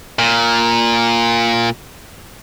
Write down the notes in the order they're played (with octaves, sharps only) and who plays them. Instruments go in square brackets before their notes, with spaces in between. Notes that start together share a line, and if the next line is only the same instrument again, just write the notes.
[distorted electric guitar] A#2